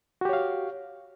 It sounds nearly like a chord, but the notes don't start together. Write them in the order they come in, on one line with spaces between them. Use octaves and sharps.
F#4 G4 C#5 F5